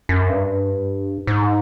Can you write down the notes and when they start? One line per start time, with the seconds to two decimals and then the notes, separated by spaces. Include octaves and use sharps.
0.09 F#2
0.29 G2
1.27 G#2